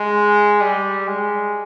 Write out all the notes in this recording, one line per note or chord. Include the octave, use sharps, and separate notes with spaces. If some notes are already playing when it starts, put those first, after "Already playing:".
Already playing: G#3
G3
G#3